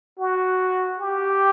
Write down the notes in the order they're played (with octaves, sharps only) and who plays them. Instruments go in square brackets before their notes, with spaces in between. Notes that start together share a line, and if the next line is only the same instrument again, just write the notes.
[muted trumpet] F#4
G4